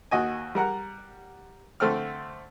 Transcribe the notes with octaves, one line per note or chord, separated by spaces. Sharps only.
D#2 F#4 D#5 G#5
G3 A#4 F#5 A#5
D3 A3 C4 G5 F6